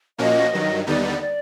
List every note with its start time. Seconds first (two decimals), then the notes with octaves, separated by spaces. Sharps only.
0.18 A#2 F3 A#3 C#4 F#4 D#5
0.53 G2 D#3 F#3
0.83 D#5
0.87 D#2 D3 G3 B3 D#4 D5
1.21 D5